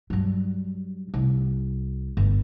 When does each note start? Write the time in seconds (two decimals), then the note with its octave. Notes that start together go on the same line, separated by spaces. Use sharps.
0.10 G2 F#3
1.14 C2
2.17 G1